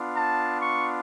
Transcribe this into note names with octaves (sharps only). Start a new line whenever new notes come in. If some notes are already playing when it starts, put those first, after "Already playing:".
Already playing: B3 D4 F4
A5
C#6